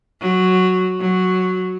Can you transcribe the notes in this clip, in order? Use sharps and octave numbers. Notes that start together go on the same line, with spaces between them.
F#3
F#3